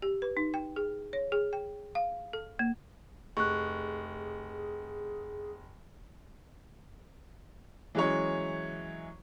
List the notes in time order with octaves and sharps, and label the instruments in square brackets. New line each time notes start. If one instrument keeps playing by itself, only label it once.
[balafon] G4
B4
D#4
G5
G#4
C#5
G#4
G5
F5
A4
A#3
[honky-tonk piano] F1 [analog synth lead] G#4 [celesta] C#6 F#6
[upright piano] E3 F#3 G#3 C#4 C#5